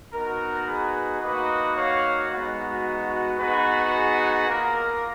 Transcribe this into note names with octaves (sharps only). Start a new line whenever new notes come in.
B3 D#4 F#4 A#4
G#4 B4
A#3 D#4 F#4 B4 D#5
C#5 F5
G#3 B3 D#4 F#4
B3 D#4 F#4 G#4 B4
G#4
A#3 F4 A#4